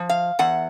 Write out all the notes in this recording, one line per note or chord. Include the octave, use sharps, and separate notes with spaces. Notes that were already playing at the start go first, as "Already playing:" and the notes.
Already playing: F3
F5
E2 F#5